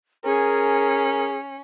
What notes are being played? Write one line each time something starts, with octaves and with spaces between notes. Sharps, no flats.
C#4 G#4 A#4